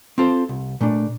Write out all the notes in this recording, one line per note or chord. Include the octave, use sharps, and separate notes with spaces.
C4 F4 A4 C5
C2
A#2 A3 D4